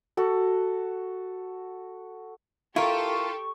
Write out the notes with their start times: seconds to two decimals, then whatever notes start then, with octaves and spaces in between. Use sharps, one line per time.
0.17 F#4 A4
2.76 E4 F4 G4 A4 A#4 C#6